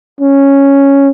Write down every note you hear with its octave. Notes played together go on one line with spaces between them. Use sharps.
C#4